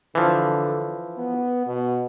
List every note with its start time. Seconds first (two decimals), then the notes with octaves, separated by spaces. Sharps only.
0.15 D3 E3 F3
1.18 B3
1.67 B2